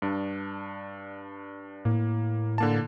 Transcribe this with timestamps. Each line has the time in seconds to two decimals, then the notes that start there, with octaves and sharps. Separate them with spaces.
0.02 G2 D4
1.85 A2 A#3
2.58 D3 A#3 A5